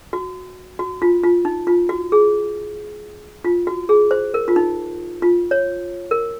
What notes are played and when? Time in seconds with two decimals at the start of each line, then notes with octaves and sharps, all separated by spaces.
0.13 F#4
0.79 F#4
1.02 F4
1.24 F4
1.45 D#4
1.67 F4
1.89 F#4
2.12 G#4
3.45 F4
3.67 F#4
3.89 G#4
4.11 C5
4.34 A#4
4.48 F4
4.56 D#4
5.22 F4
5.51 C#5
6.11 A#4